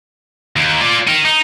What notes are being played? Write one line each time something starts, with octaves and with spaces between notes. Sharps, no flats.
D#2
F4 D5
D#4 A#4
D#4